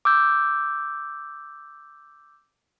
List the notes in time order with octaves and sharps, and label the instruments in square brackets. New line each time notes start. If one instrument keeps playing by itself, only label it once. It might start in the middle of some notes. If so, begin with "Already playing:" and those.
[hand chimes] D6 E6 G6